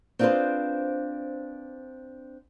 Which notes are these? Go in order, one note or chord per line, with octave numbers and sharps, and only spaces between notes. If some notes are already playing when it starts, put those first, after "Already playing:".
C4 D4 F4 G#4 B4 C5